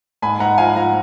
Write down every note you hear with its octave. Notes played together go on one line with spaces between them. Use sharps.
G#2 G#5 B5
G#2 F#5 A#5
F3 F5 G#5
F3 F#5 A#5